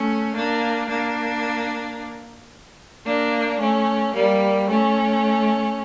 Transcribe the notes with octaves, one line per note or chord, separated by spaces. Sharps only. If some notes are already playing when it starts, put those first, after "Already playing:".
Already playing: A3 C#4
A#3 D4
A#3 D4
A#3 D4
A3 C#4
G3 A#3
A3 C#4